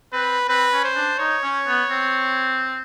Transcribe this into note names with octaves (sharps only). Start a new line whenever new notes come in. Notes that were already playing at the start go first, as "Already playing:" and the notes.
C4 B4
C4 B4
C#4
C5
D4
D#4 C#5
C#4
B3
C4